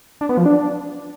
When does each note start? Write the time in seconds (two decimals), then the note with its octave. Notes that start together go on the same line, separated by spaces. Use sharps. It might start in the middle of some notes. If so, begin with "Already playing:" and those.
0.21 D4
0.29 B3
0.37 F3
0.46 D4